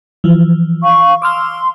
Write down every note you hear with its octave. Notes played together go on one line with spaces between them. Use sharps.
E3 F3
F5 C#6
C6 D6 E6 F6